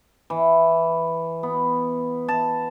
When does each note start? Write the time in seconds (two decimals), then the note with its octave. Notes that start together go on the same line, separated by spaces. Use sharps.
0.30 E3
1.43 B3
2.28 A5